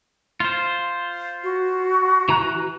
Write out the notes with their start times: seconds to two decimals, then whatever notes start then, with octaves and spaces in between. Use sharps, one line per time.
0.40 F4 C5
1.44 F#4
2.29 E3 A#5 F#6